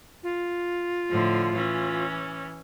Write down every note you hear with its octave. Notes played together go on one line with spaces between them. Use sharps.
F4
A2 D3 F3
E3 C#4